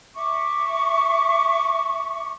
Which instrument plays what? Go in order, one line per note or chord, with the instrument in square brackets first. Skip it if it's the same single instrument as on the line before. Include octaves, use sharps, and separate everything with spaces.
[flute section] E5 C#6 D6